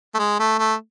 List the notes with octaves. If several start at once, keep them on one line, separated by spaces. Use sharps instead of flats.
A3
G#3
A3
A3